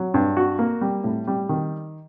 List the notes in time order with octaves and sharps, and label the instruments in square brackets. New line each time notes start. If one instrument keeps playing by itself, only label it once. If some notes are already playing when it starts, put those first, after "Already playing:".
Already playing: [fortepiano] F#3
G2
F#4
A#3
G3
A2
G3
D#3